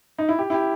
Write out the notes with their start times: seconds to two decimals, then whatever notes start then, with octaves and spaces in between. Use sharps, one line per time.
0.19 D#4
0.29 E4
0.39 G4
0.50 E4
0.54 G4